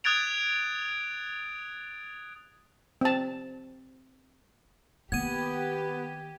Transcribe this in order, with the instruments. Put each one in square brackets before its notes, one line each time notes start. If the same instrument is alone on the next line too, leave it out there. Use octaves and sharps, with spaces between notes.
[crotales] D#6 F#6 G#6 A6 D7 F7
[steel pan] C4 A5
[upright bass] D#3 A#3 [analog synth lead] B3 [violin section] G4 [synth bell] G#6 D#7